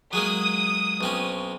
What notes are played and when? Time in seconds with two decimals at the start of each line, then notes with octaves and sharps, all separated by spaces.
0.13 F#3 G#3 A#3 D#6
1.01 B1 C4 C#4